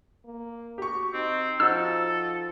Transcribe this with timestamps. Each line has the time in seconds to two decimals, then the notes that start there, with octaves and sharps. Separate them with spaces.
0.25 A#3
0.78 F#4 G4 C#6
1.14 C4 D#4
1.60 F3 D#4 F#4 A4 E6